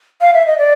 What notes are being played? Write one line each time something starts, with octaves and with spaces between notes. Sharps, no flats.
F5
E5
D#5
D5